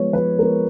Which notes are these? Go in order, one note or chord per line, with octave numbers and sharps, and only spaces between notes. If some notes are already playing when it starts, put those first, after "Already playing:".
Already playing: F3 G#3 B3 C#5
F3 B4
G#3 B3 A#4